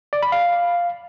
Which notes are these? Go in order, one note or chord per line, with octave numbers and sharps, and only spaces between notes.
D5
B5
F5